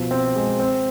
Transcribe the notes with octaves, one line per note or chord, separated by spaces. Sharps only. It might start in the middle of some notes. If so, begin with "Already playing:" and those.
Already playing: B2 F3
C4
G#3
C4